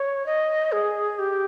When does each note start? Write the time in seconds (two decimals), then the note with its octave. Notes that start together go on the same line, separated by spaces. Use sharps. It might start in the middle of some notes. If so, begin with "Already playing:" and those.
Already playing: C#5
0.26 D#5
0.72 G#4
1.19 G4